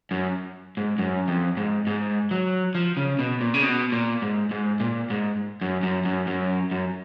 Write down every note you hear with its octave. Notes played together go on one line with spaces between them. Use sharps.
F#2
G#2
F#2
F2
G#2
G#2
F#3
F3
C#3
B2
A#2
C#3
B2
A#2
G#2
G#2
A#2
G#2
F#2
F#2
F#2
F#2
F#2